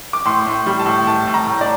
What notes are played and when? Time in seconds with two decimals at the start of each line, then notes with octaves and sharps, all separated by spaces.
0.13 D6
0.25 A2 C6
0.46 A2
0.66 G3
0.79 A5
0.86 A2
1.07 A2 A5
1.27 A2
1.34 A#5
1.47 A2
1.61 D5